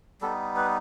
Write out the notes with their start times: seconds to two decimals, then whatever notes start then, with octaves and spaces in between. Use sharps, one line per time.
0.22 G3 B3 D#4 A4
0.56 B4